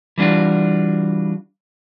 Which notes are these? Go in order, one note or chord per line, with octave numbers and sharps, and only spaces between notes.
E3 G3 D4 F4 F#4